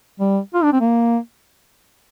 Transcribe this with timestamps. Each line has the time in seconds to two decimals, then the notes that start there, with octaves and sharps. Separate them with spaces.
0.20 G3
0.54 F4
0.63 D4
0.73 C4
0.80 A#3